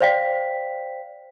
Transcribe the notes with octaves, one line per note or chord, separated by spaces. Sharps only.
C5 D5 F5 G5 B6